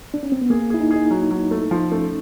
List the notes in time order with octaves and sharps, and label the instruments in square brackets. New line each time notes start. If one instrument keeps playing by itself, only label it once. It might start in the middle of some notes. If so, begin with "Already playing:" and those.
[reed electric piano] D4
C#4
C4
B3
[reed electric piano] A#3 [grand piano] G#4
[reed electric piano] E4 [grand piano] G#4
[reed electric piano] D#4
[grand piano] G#4
[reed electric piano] D#4
[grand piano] F#3
F#3
A3
[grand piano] F3 [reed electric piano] D#4
[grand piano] A3 [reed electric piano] C#4